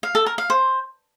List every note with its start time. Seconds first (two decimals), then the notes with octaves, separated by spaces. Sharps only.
0.03 F5
0.15 A4
0.26 A#4
0.38 F5
0.50 C5